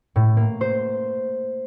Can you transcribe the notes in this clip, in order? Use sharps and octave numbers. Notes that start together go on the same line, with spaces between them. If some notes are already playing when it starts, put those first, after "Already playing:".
A2
A#3
C5